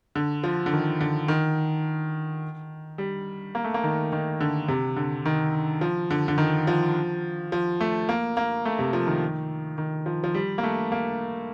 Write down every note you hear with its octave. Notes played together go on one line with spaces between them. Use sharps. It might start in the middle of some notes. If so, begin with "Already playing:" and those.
D3
F3
D3
D#3
D3
D#3
G3
A#3
A3
A#3
D#3
D#3
D3
C3
D3
D#3
F3
D3
D3
D#3
F3
F3
A3
A#3
A#3
A3
C3
F3
D#3
D#3
F3
F3
G3
A#3
A3
A#3